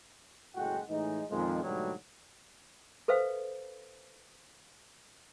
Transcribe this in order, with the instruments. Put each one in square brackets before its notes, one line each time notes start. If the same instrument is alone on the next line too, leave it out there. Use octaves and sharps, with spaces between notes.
[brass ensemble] F#1 A2 G#3 F#4 F#5 G5
A2 E3 G#3 D#4
F2 A#2 D#3 F3 G#3
G#2 B2 D3 F#3 G3 A3
[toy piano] A4 B4 C5 E5 F5